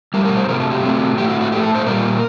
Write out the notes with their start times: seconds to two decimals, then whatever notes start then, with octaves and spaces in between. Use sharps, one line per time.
0.14 G3 A#4
0.17 A2
0.25 A#4
0.37 C5
0.48 C3 F#3 A3 A#4
0.60 A4
0.71 G4
0.83 C3 F#3 A3
1.17 A2 A3 G4
1.29 F#4
1.41 F#4
1.52 A2 A3 G4
1.63 A4
1.75 C5
1.86 A#2 G3 A#4